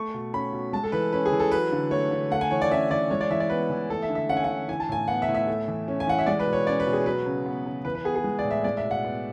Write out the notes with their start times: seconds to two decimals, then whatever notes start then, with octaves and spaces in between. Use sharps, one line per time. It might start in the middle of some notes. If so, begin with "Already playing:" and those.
Already playing: A3 C#6
0.14 B2
0.33 C#4 B5
0.53 B2
0.73 G#3 A5
0.84 A4
0.92 E3 B4
1.12 C#4 B4
1.26 G#4
1.32 E3
1.40 A4
1.51 F#3 B4
1.72 D3
1.91 A3 C#5
2.11 D3
2.31 A3 F#5
2.41 G#5
2.51 E3 C#5
2.62 D5
2.71 C#4 E5
2.91 E3 D5
3.10 G#3 C#5
3.21 D5
3.30 E3 E5
3.40 D5
3.50 B3 B4
3.70 E3
3.90 A3 A4
4.02 E5
4.09 D3
4.15 E5
4.29 C#4 F#5
4.37 G#5
4.44 D3 F#5
4.68 E3 G#5
4.80 A5
4.89 A2 G#5
5.08 B3 F#5
5.22 E5
5.28 A2
5.35 E5
5.47 A3
5.68 E3
5.88 C#4
6.00 G#5
6.07 E3 F#5
6.19 E5
6.26 G#3 D5
6.40 B4
6.47 B2
6.53 C#5
6.67 C#4 D5
6.80 B4
6.86 B2
6.93 G#4
7.06 F#3 B4
7.26 C#3
7.46 B3
7.66 C#3
7.85 E3 B4
7.95 B4
8.05 B3 G#4
8.15 G#4
8.24 G#3
8.39 D5
8.45 A2
8.51 E5
8.64 G#3 D5
8.77 E5
8.85 B2
8.91 F#5
9.04 B3